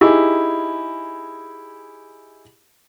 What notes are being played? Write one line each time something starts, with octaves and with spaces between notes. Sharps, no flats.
D#4 E4 G4 G#4